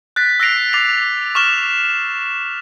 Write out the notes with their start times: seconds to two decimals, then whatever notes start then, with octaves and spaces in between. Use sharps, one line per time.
0.16 F#6 A6 B6
0.40 E6 F#6 A#6 C7 D7 F7
0.73 D6 A6 C7 F7
1.35 C#6 D6 F6 E7 G7